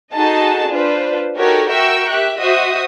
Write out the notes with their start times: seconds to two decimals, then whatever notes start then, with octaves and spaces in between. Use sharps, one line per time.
0.13 D#4 F#4 G#4 A4 D#5 A5
0.69 D4 F4 B4 C5
1.37 D#4 F#4 G4 A4 A#4 C#5
1.68 F#4 A#4 E5 G5 C#6 E6
2.09 G4 E5 F#6
2.39 F#4 C5 D#5 E5 D#6